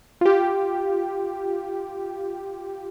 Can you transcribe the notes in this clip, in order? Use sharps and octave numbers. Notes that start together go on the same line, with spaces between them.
F4 G4